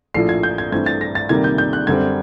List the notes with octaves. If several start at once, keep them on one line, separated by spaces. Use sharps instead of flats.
A#1 A2 F3 C7
G#6
G6
G#6
G2 E3 A3 C4 G#6
A6
A#6
A6
D2 C3 D#3 G3 A#3 G#6
G6
G6
F#6
F#2 D3 G3 C4 G#6